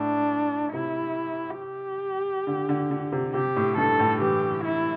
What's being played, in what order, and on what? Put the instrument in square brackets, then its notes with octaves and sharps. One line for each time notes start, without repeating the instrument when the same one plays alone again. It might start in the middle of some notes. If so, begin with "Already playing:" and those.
Already playing: [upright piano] A2 [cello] D4
[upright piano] C3 [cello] E4
[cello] G4
[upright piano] D3
D3
D3
C3
[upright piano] C3 [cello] G4
[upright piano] A2
[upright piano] G2 [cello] A4
[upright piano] A2
[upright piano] E3 [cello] G4
[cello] E4